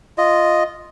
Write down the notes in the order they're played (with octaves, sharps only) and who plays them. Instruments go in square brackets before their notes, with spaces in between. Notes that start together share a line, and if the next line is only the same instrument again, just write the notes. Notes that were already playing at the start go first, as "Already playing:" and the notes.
[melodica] F4 D#5